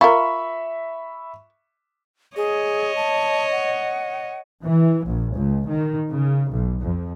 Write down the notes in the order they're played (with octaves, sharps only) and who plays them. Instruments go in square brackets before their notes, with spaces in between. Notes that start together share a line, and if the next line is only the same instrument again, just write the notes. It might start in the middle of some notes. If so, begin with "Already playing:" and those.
[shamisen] F4 A#4 [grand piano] E5 B5 C#6
[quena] G#4 [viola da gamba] C#5 D#5
[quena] A5
F#5
[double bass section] E3
A#1
C#2
D#3
C#3
B1
F2